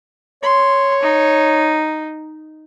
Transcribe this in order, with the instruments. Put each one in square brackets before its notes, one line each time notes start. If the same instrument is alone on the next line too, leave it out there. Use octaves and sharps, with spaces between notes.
[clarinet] C#5 [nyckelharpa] C6
[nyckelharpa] D#4